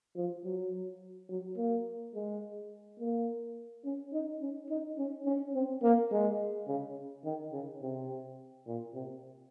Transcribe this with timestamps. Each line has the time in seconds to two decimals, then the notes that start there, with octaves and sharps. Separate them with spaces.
0.16 F3
0.44 F#3
1.29 F#3
1.57 A#3
2.14 G#3
3.00 A#3
3.85 C#4
4.13 D#4
4.42 C#4
4.70 D#4
4.98 C#4
5.25 C#4
5.55 C4
5.83 A#3
6.11 G#3
6.68 C#3
7.25 D#3
7.52 C#3
7.81 C3
8.66 A#2
8.94 C3